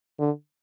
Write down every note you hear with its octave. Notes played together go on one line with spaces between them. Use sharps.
D3